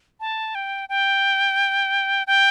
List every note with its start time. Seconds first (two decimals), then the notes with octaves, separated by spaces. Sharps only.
0.20 A5
0.55 G5
0.89 G5
2.27 G5